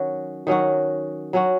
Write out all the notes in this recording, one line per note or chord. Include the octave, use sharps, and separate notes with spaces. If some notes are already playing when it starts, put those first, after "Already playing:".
Already playing: D#3 F#3 C#4 F#4
D#3 F#3 C#4 F#4
F#3 C#4 F#4